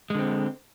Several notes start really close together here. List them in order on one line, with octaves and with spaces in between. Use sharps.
G#3 D3 C4